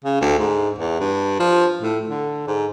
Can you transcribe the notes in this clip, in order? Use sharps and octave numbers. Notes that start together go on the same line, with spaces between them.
C#3
D2
G#2
E2
G2
F3
A2
D3
G#2